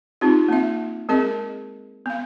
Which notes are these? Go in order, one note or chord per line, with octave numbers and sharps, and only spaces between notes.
C4 D#4 F4 G4
A#3 C4 E5
G#3 C4 G#4 A#4 D#5
B3 F5